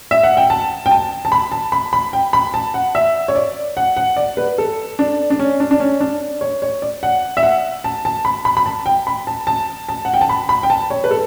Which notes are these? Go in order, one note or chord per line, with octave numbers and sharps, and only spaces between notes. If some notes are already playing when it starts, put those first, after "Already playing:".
E5
F#5
G5
A5
G5
A5
A5
B5
A5
B5
B5
G5
B5
A5
F#5
E5
C#5
D5
F#5
F#5
D5
B4
A4
D4
D4
C#4
D4
D4
C#4
D4
C#5
C#5
D5
F#5
E5
F#5
A5
A5
B5
B5
B5
A5
G5
B5
A5
A5
A5
F#5
G5
A5
B5
B5
G5
A5
C#5
B4
A4